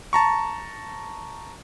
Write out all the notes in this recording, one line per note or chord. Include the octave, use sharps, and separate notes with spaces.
A5 A#5 C#6